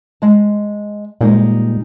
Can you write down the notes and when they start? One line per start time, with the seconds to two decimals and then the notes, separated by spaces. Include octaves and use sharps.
0.22 G#3 A5
1.21 A#2 G3 G#3 D#4